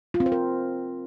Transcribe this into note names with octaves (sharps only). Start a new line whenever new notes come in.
F4
C4
C5
A#4